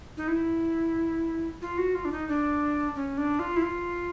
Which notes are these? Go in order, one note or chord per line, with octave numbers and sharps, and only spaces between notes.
D#4
E4
F4
F#4
F4
D4
D#4
D4
C#4
D4
F4
E4
F4